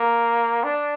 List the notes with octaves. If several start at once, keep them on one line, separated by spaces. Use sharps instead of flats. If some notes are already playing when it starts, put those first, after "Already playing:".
Already playing: A#3
D4